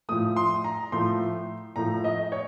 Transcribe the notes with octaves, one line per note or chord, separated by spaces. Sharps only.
A2 F3 A3 D#6
C6
A#5
A2 F3 A3 C6
A2 F3 A3 A#5
D#5
C#5